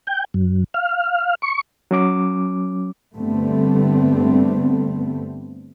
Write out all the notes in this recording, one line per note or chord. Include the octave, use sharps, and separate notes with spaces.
G5
F#2
F5
C#6
F#3 C#4 D6
G2 D3 G3 A3 B3 C4